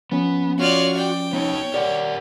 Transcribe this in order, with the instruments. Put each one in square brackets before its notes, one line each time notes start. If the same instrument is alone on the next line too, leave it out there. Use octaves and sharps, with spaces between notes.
[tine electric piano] F3 C#4 [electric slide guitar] B3
[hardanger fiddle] F4 D5 [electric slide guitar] F#4 [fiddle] C#5 F6
[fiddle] D5 [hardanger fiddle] G5
[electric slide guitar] B3 D#4 [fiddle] C#5
[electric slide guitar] G4 A#4 F#5 [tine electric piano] D5